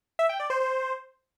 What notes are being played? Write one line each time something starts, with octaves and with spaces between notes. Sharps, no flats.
E5
G5
D5
C5
C5